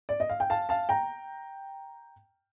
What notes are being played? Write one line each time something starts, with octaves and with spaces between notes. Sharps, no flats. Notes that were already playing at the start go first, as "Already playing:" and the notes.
D5
D#5
F5
G5
F5 A5
F5 A5
G5 A#5